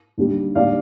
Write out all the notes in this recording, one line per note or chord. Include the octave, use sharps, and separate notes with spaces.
D#2 D3 G3
D#2 D3 G3 D5 F5